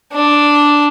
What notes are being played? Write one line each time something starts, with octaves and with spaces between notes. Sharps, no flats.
D4